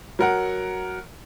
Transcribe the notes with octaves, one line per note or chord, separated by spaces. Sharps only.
F#3 A#4 F#5